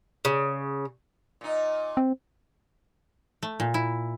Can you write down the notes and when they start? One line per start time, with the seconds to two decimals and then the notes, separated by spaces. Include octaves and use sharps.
0.25 C#3
1.41 A#2 D#4
1.97 C4
3.43 A3
3.60 A#2
3.74 E4